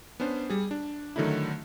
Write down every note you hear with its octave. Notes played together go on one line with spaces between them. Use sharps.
B3 C#4 D4 C5
G3 G#4
D4
D3 D#3 F#3 A3 D#4 E4